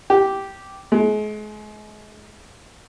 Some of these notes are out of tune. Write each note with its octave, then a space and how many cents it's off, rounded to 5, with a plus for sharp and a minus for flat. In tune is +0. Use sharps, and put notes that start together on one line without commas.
G4 -5
G#3 +35